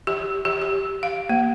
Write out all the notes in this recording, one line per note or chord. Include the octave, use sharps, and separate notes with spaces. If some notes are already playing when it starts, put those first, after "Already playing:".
G4
G4
G4
F5
A#3